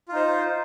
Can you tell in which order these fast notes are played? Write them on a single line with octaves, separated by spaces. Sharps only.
F4 D#4 C5